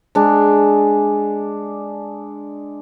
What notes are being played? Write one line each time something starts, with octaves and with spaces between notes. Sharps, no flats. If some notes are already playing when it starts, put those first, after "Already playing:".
G#3 D4